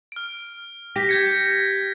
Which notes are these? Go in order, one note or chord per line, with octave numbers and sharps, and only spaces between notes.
F6 D7
G4 A#6 B6
G6 G#6 C#7